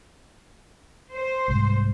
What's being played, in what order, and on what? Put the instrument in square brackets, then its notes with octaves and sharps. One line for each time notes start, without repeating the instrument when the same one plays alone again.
[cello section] C5
[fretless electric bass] C2 G#2